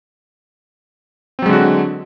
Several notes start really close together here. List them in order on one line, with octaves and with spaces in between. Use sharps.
C4 F#3 G#3 D3 F#4